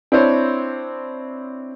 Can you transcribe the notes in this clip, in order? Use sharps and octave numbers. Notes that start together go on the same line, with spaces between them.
C4 D4 E4 C5 C#5